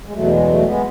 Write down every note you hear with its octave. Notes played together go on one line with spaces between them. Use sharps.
G#3
E2 B2 F#3 A3
G#3
F#3 A3
G#3 B3